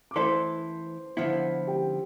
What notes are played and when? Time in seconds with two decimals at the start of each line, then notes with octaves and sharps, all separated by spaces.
0.11 D6
0.16 E3 A3 E4 A4 C5 C6
1.17 D3 F3 B3 E4
1.67 G4 G5